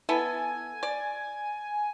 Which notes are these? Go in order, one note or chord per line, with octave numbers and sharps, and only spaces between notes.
B3 E4 A4 G#5
D5